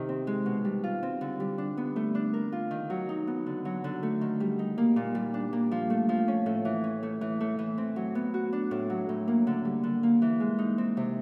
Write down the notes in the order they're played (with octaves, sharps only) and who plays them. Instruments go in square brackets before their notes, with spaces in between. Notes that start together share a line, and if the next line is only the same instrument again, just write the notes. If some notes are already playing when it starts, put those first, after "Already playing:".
Already playing: [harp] C3 D#3 G4
C4
G#3
B2
G3
F4
C4
D3
G3
D4
B3
A3
D4
A#4
F4
D#3
F#3
D#4
B3
D3
F#3
D3
A3
D#3
G3
D#4
A#3
A#2
G3
D4
A#3
F3
A3
F3
C#4
A2
E3
C#4
A3
E3
A3
E3
C4
F#3
B3
F#4
D4
A2
F#3
A2
A#3
D3
G3
D3
A#3
E3
G#3
D#4
C4
C3